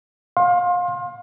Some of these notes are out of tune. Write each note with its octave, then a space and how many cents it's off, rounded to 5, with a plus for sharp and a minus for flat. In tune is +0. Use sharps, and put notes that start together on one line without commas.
F5 +30 C6 +25